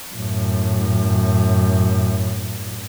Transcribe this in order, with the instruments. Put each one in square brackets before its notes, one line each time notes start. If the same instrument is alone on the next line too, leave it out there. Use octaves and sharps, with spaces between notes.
[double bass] F#2 A2